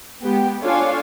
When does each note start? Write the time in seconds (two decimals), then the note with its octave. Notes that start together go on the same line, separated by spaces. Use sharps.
0.23 G#3 B3 G4
0.62 D4 F4 A4 C#5 F5 G#5